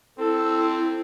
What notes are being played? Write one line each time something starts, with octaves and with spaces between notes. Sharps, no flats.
C4 E4 A4